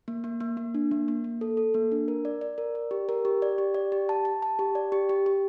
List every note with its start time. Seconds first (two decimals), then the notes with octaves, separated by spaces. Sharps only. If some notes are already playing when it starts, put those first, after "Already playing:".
0.08 A#3
0.24 A#3
0.40 A#3
0.57 A#3
0.74 D4
0.91 A#3
1.08 A#3
1.24 A#3
1.41 A4
1.57 A4
1.74 A#3
1.92 D4
2.08 A#4
2.25 D5
2.41 D5
2.58 A#4
2.75 D5
2.91 G4
3.09 A#4
3.25 G4
3.42 D5
3.58 G4
3.74 D5
3.92 G4
4.09 A5
4.25 A5
4.42 A5
4.59 G4
4.75 D5
4.92 G4
5.09 G4
5.26 G4